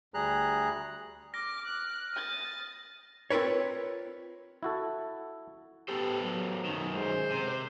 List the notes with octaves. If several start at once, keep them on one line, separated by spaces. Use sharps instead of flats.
D2 G3 G#4 A#5 F#6
D6 F6 A#6
F#6
D#6 A6
C4 F4 A#4 B4 C#5
E4 F#4 A4
B3 G4 A4 C5
F#3
F#2 D#3
G#3 C5
C3